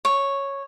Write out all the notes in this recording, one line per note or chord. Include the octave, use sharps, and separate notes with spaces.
C#5